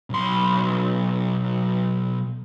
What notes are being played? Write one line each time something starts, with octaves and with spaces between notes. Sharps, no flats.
B1 C6